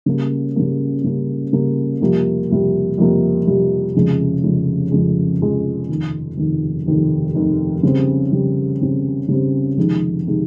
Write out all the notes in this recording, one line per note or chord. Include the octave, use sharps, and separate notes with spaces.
C#3 G3 A#3
C#3 G3 A#3
C#3 G3 A#3
C#3 G3 A#3
F2 C3 G3 A#3
F2 C3 G3 A#3
F2 C3 G3 A#3
F2 C3 G3 A#3
F1 F2 C#3 G#3
F1 F2 C#3 G#3
F1 F2 C#3 G#3
F1 F2 C#3 G#3
F1 D#2 D#3
F1 D#2 D#3
F1 D#2 D#3
F1 D#2 D#3
C#3 G3 C4
C#3 G3 C4
C#3 G3 C4
C#3 G3 C4
F1 F2 C3 D#3 G#3
C3 D#3 G#3